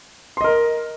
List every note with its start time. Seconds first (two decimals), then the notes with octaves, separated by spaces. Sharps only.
0.37 C6
0.41 D#5
0.44 A#4